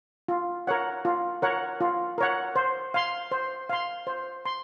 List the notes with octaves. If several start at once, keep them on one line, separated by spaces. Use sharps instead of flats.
F4
A#4 C#5 F#5
F4
A#4 C#5 F#5
F4
A#4 C#5 F#5
C5
F5 C6
C5
F5 C6
C5
C6